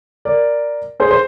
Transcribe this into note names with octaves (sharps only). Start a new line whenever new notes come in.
A#4 D5
G#4 C5
C5